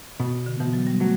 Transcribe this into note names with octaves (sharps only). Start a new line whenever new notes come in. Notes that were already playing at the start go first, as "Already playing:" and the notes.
B2 B3
D3
B2 E3
F#3
G3
F#3 A3